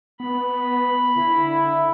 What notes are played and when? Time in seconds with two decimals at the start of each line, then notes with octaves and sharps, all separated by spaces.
0.20 B3 B5
1.16 D3 E4